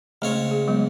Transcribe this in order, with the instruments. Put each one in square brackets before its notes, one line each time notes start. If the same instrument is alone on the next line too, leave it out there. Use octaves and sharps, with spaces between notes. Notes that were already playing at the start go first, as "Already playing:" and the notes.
[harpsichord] C#2 C4 C#5 [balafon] A3
[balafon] G#4
F#3 G#3 B3